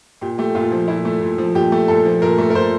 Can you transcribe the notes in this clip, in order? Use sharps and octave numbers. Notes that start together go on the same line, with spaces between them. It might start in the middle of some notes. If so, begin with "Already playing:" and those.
A#2 G4
A3 G4
A#2 F4
F3
A#2 E4
A3
A#2
F3
A#2 G4
A3
A#2 A4
F3
A#2 A#4
A3
A#4
A#2 C5